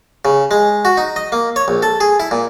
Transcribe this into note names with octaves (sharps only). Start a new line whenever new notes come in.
C#3
G#3
F#4
D#4
D#5
A#3
C#5
A#1
A4
G#4
E4
A#2